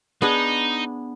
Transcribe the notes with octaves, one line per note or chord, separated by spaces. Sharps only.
B3 D4 D#4 G#4